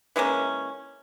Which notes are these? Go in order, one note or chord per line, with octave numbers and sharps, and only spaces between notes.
E3 G#3 A#3 C#4